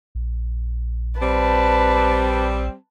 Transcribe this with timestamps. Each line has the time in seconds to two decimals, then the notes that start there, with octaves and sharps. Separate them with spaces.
0.15 A#1
1.21 G3 C4 B4 A5